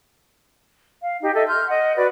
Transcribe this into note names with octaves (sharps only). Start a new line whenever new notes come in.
F5
D#4 G4
A4 D#5 E5
C6 F6 G6
D#5 F#5
F#4 B4 D5